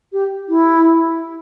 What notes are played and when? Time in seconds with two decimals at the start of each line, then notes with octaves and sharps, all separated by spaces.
0.13 G4
0.49 E4